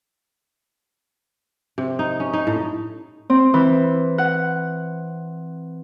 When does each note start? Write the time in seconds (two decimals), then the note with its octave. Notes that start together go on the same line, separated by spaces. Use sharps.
1.78 C3
1.99 D#4
2.20 C#4
2.33 D#4
2.47 A2
3.30 C4
3.54 E3
4.18 F#5